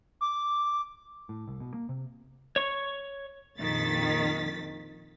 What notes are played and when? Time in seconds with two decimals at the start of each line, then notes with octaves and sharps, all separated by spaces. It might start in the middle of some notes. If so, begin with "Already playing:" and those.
0.21 D6
1.29 A2
1.48 C2
1.60 B2
1.74 A#3
1.89 C3
2.56 C#5 C#6
3.58 A#1 F2 D#3 A6 B6